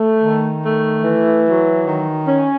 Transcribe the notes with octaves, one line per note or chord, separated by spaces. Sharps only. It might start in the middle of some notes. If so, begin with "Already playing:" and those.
Already playing: A3
D#3
A3
E3
F#3
D#3
C#4